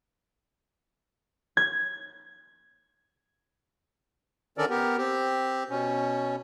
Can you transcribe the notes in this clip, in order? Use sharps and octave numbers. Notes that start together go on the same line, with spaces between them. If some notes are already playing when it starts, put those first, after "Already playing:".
G#6
D3 D#3 C#4 A4 A#4 D5
B3 G4 A#4
C4 G4
B2 C#4